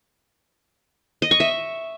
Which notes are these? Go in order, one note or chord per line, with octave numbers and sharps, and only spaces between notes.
D#5
C#6
E5